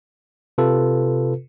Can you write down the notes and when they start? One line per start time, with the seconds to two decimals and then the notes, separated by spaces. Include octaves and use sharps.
0.58 C3 F4 A4 B4